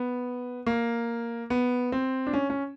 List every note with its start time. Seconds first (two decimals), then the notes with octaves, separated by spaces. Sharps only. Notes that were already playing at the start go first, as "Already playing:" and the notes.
Already playing: B3
0.67 A#3
1.50 B3
1.92 C4
2.27 D4
2.33 C#4
2.50 C#4